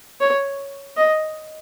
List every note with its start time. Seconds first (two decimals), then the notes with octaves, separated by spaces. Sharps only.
0.21 C#5
0.97 D#5